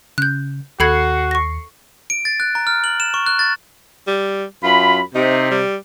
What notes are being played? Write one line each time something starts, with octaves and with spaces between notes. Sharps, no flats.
C#3 F#6 G6
D#2 F#4 A4 B5 G#6 C7 C#7
C#6 A#6
D7
A6
F#6
A#5
F6
F#7
E7
C#6
F#6
A6
G3
F#2 F4 B5
C3 D#4
G3